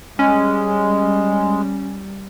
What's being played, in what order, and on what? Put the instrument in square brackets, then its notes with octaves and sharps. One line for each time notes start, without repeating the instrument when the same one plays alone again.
[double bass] G3 [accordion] G#3 [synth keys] C#4